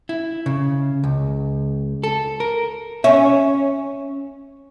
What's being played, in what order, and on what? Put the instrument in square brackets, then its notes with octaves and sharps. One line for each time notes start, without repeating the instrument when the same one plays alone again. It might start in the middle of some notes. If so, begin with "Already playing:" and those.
[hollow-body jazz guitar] E4
C#3
C#2
A4
A#4
[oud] C#4 [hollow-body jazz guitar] E5